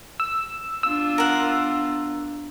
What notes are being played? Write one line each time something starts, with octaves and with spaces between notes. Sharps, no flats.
E6
B3 D4 F4 E6
A#4 F#5